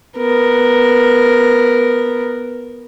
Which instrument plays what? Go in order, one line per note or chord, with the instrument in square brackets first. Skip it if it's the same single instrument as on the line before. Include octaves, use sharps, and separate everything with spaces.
[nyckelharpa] B3 A#4